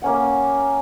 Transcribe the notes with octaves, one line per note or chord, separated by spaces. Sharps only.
A#3 C#4 F#5